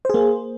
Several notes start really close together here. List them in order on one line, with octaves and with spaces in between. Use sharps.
C5 G#4 A#3